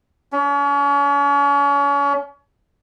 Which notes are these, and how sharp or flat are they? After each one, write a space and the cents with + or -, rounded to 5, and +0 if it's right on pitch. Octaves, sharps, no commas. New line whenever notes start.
C#4 +35